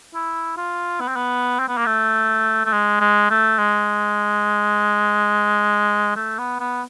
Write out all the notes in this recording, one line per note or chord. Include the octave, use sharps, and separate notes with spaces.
E4
F4
B3
C4
B3
C4
B3
A#3
A3
A3
G#3
G#3
A3
G#3
A3
B3
B3